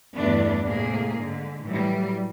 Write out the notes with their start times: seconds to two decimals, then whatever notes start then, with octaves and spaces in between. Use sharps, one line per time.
0.15 E2 G2 E3 A3 B3 D4
0.63 A2 C3 G#3 A#3 G#4
1.17 G#2 D3
1.64 A2 E3 F#3 G3